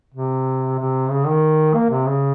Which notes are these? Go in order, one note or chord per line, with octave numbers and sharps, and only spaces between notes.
C3
C3
C#3
D#3
A#3
C3
C#3